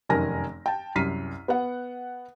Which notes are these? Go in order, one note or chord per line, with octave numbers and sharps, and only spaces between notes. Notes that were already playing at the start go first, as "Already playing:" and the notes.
F1 F#2 D#3 A#4 G#5 A#6
G5 A5
C2 F#2 F6 B6 C7 D#7
B3 F#5